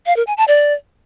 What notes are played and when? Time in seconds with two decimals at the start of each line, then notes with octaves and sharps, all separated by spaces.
0.06 F5
0.17 A#4
0.27 G#5
0.37 A5
0.48 D5